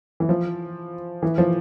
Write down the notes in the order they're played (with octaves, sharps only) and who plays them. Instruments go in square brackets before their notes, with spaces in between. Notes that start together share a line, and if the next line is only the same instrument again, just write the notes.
[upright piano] E3
F3
E3
F3